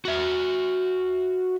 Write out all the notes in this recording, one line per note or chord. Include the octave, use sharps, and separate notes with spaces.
F#4 E5